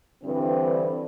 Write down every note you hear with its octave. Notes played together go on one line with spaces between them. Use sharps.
G2 D3 E3 C4